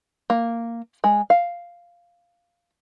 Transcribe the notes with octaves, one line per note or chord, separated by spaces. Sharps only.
A#3
G#3
F5